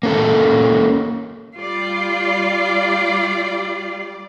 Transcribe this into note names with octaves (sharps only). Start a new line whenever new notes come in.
A#3 C#4 A4
G3 F4 D5